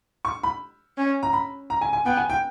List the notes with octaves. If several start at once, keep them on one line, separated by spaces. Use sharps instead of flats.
C#6
B5
C#4
A#5
B5
A#5
G#5
G#5
B3 G5
G#5
G5